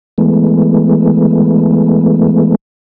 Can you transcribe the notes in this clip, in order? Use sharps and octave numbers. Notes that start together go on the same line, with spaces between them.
E3 G#3 A3 B3